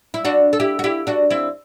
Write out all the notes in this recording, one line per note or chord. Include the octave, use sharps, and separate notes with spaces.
E4
D4 F#4
A4
E4 G4
F#4
E4 G4
D4 F#4
C4 E4